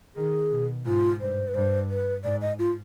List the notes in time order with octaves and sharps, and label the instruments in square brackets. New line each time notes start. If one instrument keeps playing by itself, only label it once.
[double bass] D#3 [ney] G#4
[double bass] B2
[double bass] G#2 [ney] F4
[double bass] G2 [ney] C5
[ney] B4
[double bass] G2 [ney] C5
[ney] B4
[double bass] G#2 [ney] D5
[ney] D#5
F4